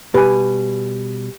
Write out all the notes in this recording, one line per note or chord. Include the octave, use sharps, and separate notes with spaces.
B2 G3 G4 B4 G#5